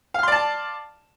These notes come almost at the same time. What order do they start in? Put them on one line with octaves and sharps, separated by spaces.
F5 F6 C6 D5 A5